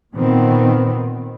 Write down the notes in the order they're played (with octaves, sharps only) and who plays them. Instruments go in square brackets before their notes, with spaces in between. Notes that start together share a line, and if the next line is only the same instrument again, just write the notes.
[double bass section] A#2 D#3 B3 C4